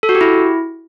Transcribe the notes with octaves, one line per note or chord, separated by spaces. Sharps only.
A4
F#4
G4
E4